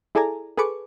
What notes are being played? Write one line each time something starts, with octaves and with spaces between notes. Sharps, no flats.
E4 G#4 A4 D5 G#5 A#5
G#4 A4 B4 C#6 D6